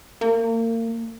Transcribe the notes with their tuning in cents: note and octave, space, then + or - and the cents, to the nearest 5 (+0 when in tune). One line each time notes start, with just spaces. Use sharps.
A#3 -35